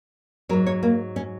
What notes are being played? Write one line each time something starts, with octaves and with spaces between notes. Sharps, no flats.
G#2 F#3 A#4
C#5
A#3
C#4